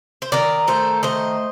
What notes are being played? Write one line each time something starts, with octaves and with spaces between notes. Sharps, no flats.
C5
D#3 A#4 D5
A3 A4 C5
D#3 C5 D#5